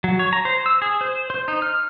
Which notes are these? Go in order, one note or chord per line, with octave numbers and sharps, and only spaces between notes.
F#3
C#5
A#5
C5
E6
G#4
C5
C5
D#4
F6